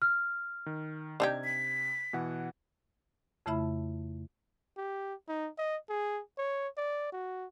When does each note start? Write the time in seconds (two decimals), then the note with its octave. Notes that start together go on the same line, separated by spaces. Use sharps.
0.02 F6
0.66 D#3
1.20 C3 D4 D#4 G4 G#6
1.45 B6
2.13 B2 E3 F#5
3.46 F2 C#3 A3 E4 E5 B5
4.77 G4
5.29 D#4
5.58 D#5
5.89 G#4
6.38 C#5
6.78 D5
7.13 F#4